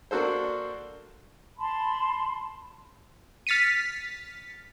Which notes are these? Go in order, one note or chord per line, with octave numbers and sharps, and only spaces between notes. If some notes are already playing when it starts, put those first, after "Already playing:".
A#3 D4 F#4 A4 C5
A5 B5 C6
F6 A6 B6 C#7 D#7